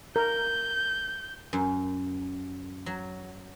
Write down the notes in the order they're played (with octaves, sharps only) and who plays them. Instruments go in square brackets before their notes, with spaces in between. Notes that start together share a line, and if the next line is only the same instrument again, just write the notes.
[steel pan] A#4 [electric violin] G6
[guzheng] F#2
F#3